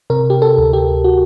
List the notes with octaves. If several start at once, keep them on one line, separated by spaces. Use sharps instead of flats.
C3 A#4
G4
A4
D2
G4
F#4